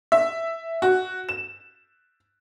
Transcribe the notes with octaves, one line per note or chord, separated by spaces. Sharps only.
E5
F#4
E7